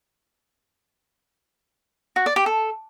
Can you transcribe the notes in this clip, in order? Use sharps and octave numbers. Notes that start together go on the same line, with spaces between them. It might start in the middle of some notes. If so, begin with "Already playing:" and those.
F#4
D5
G4
A4